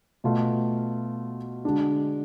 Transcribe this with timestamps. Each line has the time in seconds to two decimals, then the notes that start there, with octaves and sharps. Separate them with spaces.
0.24 B2 A3 F4
1.64 D3 G#3 D4 F#4